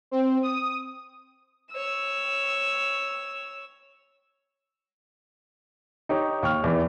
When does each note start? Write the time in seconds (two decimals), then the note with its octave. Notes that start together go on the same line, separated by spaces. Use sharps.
0.11 C4
0.43 D#6
1.72 C#5 E6
6.09 D#4 G4 C#5
6.43 D#2 C#6 F6
6.64 E2 E3